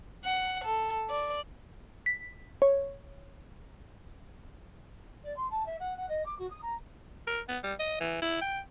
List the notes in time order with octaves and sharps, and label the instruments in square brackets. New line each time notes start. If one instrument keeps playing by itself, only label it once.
[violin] F#5
A4
D5
[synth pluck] B6
C#5
[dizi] D5
C6
A5
E5
F#5
F#5
D#5
D6
F#4
D#6
A#5
[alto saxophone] A#4
B3
G3
D#5
E3
E4
G5